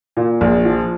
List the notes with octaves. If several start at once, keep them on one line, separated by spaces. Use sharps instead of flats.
A#2
A#1
F3